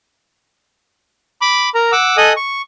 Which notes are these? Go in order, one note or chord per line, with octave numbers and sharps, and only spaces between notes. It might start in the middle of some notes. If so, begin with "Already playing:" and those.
B5 D6
A#4 A#5
F#5 D6 E6
A4 D#5 G#5 D#6 F#6
C#6